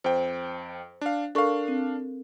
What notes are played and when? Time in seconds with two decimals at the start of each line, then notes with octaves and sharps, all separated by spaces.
0.04 F2 C5 G5
1.01 D4 F5
1.35 D4 A4 A#4 F5 C#6
1.68 C4